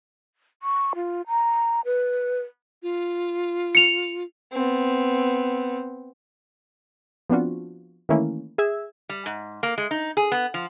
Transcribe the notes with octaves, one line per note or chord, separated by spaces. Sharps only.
C#6
F4
A#5
B4
F4
C#7 F7
B3 C4
F3 B3 C4 D4 F4 F#4
D#3 E3 A3 A#3 C#4 E4
G#4 E5 E6 G#6
G3
G#2
A#3
G#3
D#4
G#4
B3
F3